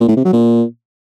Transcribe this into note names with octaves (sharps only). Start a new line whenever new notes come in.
A#2
A2
C3
F#3
A#2